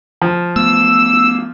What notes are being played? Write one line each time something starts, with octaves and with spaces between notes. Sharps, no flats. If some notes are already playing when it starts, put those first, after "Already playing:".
F3
A3 B3 E6